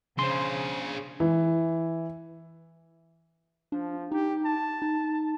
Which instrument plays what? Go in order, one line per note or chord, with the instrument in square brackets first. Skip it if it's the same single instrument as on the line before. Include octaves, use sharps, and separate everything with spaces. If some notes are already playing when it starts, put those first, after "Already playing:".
[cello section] C#3 [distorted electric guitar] D4 G#4 [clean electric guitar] C5 C6
[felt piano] E3
[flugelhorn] F3 [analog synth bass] D4
[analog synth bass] D#4 [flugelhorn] G4
[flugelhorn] A5
[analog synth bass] D#4